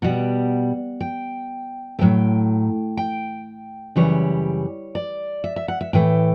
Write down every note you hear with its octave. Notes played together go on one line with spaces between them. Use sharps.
B2 G3 F#5
G5
A2 F#3 A3 G5
G5
F#2 C#3 E3 G3 C#5
D5
E5
E5
F#5
E5
A2 E3 A3 G5